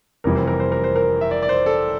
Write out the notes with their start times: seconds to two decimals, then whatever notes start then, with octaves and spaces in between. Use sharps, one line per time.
0.24 F1 F2 E3 G3 A#4
0.36 C5
0.47 A#4
0.60 C5
0.72 A#4
0.84 C5
0.96 A#4
1.21 E5
1.31 D5
1.43 D5
1.49 C5
1.66 A4